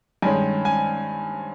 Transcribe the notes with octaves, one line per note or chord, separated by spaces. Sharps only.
G2 D#3 G#3 C#4 G#5
G#5